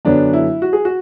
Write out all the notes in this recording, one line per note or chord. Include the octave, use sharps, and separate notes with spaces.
F#2 D3 F#3 B3 D4
E4
F#4
G#4
F#4